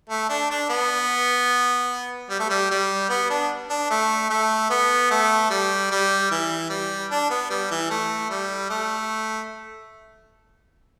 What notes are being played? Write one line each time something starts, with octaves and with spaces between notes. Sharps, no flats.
A3
D4
D4
B3
G3
A3
G3
G3
B3
D4
D4
A3
A3
B3
A3
G3
G3
E3
G3
D4
B3
G3
E3
A3
G3
A3